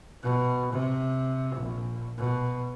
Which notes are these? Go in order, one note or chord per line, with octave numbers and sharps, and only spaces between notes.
B2
C3
A#1
B2